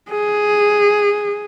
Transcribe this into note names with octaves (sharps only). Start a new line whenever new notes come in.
G#4